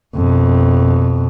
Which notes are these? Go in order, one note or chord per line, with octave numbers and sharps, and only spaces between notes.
F2 B2